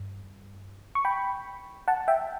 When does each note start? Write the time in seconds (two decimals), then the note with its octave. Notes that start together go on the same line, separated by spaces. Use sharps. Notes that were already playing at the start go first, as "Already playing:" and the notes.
Already playing: G2
0.95 C#6
1.05 G5 B5
1.88 F#5 A5
2.08 E5 G5